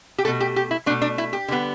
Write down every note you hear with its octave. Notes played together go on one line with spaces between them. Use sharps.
G4
B2 A3 A4
G4
G4
E4
B2 A3 D4
D4
E4
G4
D3 G3 B3